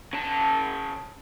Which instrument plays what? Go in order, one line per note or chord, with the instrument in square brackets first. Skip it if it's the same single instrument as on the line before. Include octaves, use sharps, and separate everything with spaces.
[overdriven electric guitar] C#3 A5